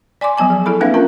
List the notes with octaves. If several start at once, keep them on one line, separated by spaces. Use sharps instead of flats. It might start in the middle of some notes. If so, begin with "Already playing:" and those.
D5 G#5 C6 D6
F3 F#3 B3 G#5 A5
G#4
E4 G#4 A4 B5
A#3 C4 D4 B4 E5 F5
C#4 F4 A#4 A5